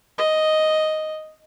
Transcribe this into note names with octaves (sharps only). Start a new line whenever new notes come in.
D#5